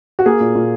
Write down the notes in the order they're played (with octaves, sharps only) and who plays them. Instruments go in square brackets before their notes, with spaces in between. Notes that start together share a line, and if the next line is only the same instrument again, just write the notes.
[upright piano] F#4
A#3 G#4
A#2
A#2